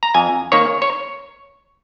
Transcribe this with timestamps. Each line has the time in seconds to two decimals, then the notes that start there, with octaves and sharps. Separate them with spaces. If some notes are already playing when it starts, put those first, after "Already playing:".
0.03 A#5
0.15 F2 G#5
0.52 D#3 A#3 C#5
0.82 C#5